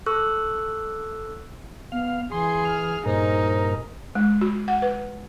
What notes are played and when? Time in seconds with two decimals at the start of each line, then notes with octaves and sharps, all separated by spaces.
0.06 A4 C#6 E6 F#6
1.92 B3 F5
2.32 E3 G#4 C6
2.65 F6
3.06 G2 A#2 D#4 A#4 C5
4.15 G#3
4.41 F#4
4.68 F#5
4.82 B4